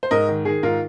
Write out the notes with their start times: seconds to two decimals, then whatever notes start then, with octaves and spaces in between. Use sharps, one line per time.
0.03 C5
0.11 G#2 A#4 D#5
0.29 D#3
0.45 D#3 G#4
0.63 G#2 F4 A#4